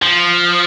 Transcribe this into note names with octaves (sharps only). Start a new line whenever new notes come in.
F3